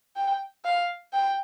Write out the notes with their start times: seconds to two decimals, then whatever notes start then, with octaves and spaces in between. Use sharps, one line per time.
0.16 G5
0.64 F5
1.13 G5